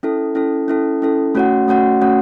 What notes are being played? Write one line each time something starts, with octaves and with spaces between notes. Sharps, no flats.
C#4 E4 A4
C#4 E4 A4
C#4 E4 A4
C#4 E4 A4
A3 C#4 F#4 C#5 F#5
A3 C#4 F#4 C#5 F#5
A3 C#4 F#4 C#5 F#5